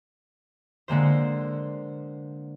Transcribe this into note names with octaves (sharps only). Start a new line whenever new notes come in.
D3 G#3 A#3 C5